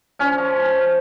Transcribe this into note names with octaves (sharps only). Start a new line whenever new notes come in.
F3 C#4
F3